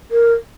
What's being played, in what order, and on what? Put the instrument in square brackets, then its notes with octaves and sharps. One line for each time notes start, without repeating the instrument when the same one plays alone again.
[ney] A#4